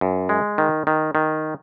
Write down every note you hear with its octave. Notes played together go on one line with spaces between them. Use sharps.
F#2
G#3
D#3
D#3
D#3